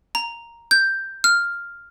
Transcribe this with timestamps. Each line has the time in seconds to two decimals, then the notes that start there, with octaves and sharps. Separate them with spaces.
0.15 A#5
0.71 G6
1.24 F6